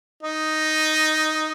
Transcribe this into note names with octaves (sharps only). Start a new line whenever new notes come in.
D#4